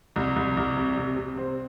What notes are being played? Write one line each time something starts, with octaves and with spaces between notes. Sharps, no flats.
C2
C2
C2
C3
C3
C3
C4